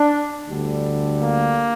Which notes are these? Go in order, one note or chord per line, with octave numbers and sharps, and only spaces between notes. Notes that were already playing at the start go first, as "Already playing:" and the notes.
Already playing: D4
D2 D3 G3
A#3